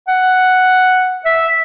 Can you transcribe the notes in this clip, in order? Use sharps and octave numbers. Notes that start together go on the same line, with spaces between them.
F#5
E5